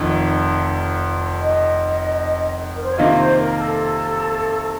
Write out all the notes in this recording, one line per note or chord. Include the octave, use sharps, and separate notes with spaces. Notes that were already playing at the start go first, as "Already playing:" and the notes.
Already playing: F1 F2 D#3
D#5
A#4
C5
C#5
C3 D#3 A#3 F4 D#5
C5
A#4
A4